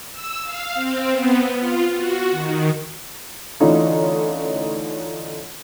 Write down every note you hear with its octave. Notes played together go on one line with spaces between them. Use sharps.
E6
F5
C4
B3
F4
F#4
D#3
D3 E3 A3 C#4 D#4 F4